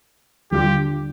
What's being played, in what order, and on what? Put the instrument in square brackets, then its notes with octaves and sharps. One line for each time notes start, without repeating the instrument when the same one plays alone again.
[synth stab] D#2 D3 G3 D4 F4 [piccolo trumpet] G4